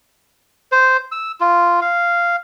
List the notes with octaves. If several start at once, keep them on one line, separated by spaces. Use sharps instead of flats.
C5
E6
F4
F5